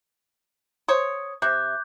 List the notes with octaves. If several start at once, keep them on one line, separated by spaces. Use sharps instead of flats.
C5 C#5 D#6
C3 E5 D6 F#6 G6